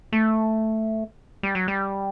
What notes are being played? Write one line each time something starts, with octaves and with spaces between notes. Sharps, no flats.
A3
G3
F#3
G3